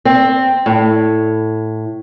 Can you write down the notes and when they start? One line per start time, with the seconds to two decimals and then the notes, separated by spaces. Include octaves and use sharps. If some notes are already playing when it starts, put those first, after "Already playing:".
0.05 C4
0.66 A2